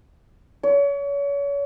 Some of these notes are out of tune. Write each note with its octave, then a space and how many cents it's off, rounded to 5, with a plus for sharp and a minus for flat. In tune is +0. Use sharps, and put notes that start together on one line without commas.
C#5 +35